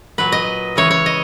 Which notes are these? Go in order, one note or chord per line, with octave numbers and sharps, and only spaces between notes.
A#2 F#3 B4
D#5
C#3 E3 G#3 C#5
C#5
D#5